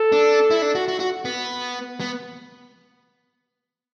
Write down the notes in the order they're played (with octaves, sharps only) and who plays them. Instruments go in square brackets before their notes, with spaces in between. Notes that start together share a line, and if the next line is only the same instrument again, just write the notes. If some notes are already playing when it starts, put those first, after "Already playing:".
Already playing: [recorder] A4
[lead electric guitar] D4
E4
D4
F#4
F#4
F#4
B3
B3